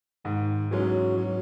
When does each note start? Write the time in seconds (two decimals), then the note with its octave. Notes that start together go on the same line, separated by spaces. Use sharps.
0.25 G#2 D#3
0.71 E3 F#3 G#3 C#4
1.17 F#3